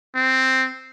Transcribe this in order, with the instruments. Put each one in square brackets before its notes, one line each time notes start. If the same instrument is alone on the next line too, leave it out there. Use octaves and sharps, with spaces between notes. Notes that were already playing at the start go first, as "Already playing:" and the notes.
[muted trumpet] C4